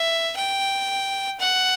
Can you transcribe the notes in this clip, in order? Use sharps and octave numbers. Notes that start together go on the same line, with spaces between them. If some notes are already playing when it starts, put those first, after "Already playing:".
Already playing: E5
G5
F#5